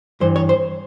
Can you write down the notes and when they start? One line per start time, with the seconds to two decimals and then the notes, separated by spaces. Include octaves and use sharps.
0.21 G2 E3 C5
0.36 C#5
0.49 C5